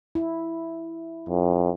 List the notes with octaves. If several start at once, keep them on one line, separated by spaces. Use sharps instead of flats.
E4
F2